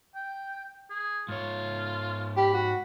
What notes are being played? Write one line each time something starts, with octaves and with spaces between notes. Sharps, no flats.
G5
G#4
G#2 F4 C#5
G4 B5
F#4